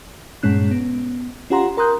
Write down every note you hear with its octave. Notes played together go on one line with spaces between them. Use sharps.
G2 A#2 G#3 C#4 F#6
B3
C#4 F4 G4 F#5 A#5 C6
A#4 A#5 C6 D#6 F#6 G6